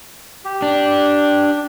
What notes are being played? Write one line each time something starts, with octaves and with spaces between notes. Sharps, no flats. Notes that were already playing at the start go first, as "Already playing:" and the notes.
G4
D4